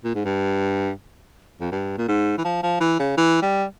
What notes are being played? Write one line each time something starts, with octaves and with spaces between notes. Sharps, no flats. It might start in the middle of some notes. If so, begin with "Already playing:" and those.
A#2
G#2
G2
F2
G2
A#2
G#2
E3
F3
F3
E3
C#3
E3
G3